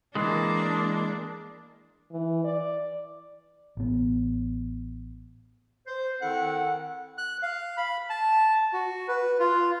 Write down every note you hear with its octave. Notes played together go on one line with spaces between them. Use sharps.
E3 G#3 A#3 D4
E3
D5
A1 B3
C5
D#3 C4 E4 A4 F#5
F#6
F5
B5
A5
F#4
B4
F4